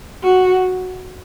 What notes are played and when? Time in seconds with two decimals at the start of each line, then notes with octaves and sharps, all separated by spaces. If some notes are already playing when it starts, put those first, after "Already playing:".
0.23 F#4